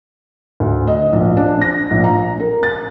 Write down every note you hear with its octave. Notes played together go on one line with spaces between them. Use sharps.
D2
D#5
A#1
D4
A#6
A#1
A#5
A#4
A6